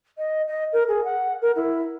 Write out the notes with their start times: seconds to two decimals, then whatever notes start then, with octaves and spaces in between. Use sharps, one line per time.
0.17 D#5
0.47 D#5
0.72 A#4
0.87 G#4
1.04 F#5
1.41 A#4
1.55 E4